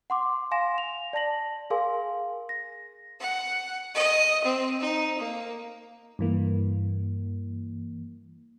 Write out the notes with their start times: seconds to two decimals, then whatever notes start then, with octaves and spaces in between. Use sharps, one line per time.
0.10 F#5 C6 D6
0.51 F5 G#5 C6 A#6 E7
0.78 F7
1.13 D5 A5 A#6 F#7
1.70 G#4 A#4 F5 G#5 C6
2.49 A#6
3.20 F#5
3.94 D#5
4.43 C4
4.80 D#4
5.18 A#3
6.19 G2 E3 A#3